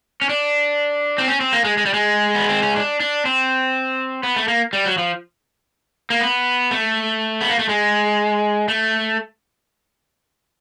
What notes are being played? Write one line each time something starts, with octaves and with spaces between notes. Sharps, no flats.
C#4
D4
C4
C#4
C4
A#3
G#3
G#3
G3
G#3
B3
C4
C#4
D4
D4
C4
B3
A3
A#3
G3
F#3
F3
A#3
B3
A3
B3
A#3
A3
G#3
A3